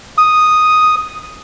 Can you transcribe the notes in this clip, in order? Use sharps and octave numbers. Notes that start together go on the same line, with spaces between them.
D#6